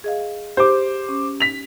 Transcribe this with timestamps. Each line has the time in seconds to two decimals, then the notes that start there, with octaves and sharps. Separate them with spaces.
0.04 G#4 D#5 F5
0.57 G4 C5 D6
1.09 C#4
1.40 B6 F7